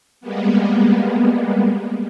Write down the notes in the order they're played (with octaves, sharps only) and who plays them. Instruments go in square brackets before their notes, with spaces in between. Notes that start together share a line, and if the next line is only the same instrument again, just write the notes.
[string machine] G3 G#3 A#3 B3